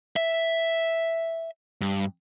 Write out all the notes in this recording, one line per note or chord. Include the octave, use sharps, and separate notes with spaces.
E5
G2